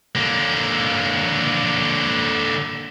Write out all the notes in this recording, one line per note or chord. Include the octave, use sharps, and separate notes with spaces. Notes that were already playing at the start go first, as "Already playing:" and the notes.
D3 A#3